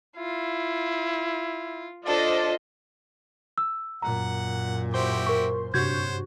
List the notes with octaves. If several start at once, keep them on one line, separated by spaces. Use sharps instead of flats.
E4 F4
D4 F4 A4 C5 D5 D#5
E6
F#2 A#2 F#5 A#5
E4 F#4 G4 C5 C6
A#4 C#6
G2 C3 F#4 C5 C#5 G6 G#6